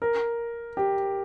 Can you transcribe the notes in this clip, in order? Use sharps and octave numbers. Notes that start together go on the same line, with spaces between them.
A#4
G4